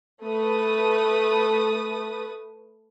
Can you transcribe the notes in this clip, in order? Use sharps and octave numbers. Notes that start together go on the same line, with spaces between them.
A3 B4 D#6